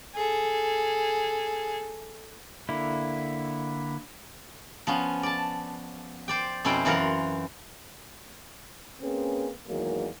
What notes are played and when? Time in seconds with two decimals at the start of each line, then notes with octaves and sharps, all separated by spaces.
0.15 G#4 A4
2.69 D3 A#3 E4
4.87 F3 B3 C#4
5.23 D5 A5
6.28 C5 D5 G5
6.65 F2 B2 C#4 E4 C5 G5
6.85 F#2 E3 F4 A#4 C5 F#5
9.01 A#3 C4 C#4 G#4 B4
9.67 E2 D#3 F#3 G#3 A#3